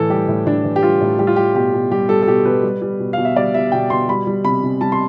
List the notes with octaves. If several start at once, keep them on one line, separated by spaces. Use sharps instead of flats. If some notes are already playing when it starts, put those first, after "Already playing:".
Already playing: A2 E3 A4
G3 G4
A2
A2 D4
E3
G4
G3 F4
A2
G3 G4
F4
G3 G4
B2 G4
B2
G3 G4
G3 A4
A4
B2 G4
B2 B4
G3
G3
B2
B2 F5
E5
G3 D5
G3 E5
B2 G5
B2 C6
G3 B5
G3
C3 B5
C3
G3 A5
C6